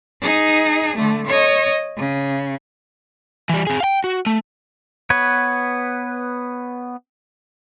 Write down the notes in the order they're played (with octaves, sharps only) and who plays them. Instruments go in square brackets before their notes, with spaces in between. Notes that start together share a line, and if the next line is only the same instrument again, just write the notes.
[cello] D#4 G#4
D3 A3
C#5 D#5
C#3
[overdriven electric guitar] E3 G3
C4 G#4
F5 G5
F#4
A3
[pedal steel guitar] B3 B4 C#5